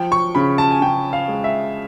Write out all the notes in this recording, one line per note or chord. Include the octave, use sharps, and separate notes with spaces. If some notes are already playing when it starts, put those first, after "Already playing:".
Already playing: F3 G5
C#6
C#3 B5
A5
G#5
C#3 G5
F5
G#3
E5